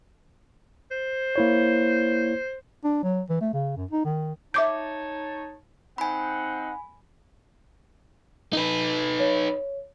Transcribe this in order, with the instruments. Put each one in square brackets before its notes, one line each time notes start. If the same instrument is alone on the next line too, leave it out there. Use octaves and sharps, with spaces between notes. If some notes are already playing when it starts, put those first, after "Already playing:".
[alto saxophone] C5
[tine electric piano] A#3 E4 C#5
[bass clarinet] D4
F#3
E3
A3
C#3
F#2
D#4
D#3
[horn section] D#4 C#5 A5 [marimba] E5 D6 G6
[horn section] C4 D#4 F#5 [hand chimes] G#5 B5
[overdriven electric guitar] D#4 B4
[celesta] C#5